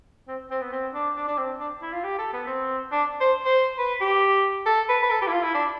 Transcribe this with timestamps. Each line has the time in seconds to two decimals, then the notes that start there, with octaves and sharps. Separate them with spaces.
0.28 C4
0.51 C4
0.61 B3
0.72 C4
0.94 D4
1.16 D4
1.28 D4
1.38 C4
1.60 D4
1.82 E4
1.93 F4
2.04 G4
2.18 A4
2.33 B3
2.47 C4
2.92 D4
3.20 C5
3.45 C5
3.78 B4
4.01 G4
4.66 A4
4.89 B4
5.02 B4
5.10 A4
5.21 G4
5.28 E4
5.32 F4
5.43 E4
5.54 D4